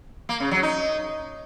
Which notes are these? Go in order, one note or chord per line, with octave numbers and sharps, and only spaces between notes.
A#3
C#3
F#3
D#4